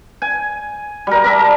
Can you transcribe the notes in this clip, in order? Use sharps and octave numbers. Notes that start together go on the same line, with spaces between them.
G#5
G3 A#4
A#4 D5 E5 A5